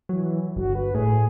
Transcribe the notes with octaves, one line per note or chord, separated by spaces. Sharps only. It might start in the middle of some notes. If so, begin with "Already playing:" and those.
E3 F#3
G1 F#4
B4
A2 G#4